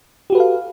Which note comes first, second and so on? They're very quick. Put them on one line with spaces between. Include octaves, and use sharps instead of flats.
G4 F#4 B4 A4 F5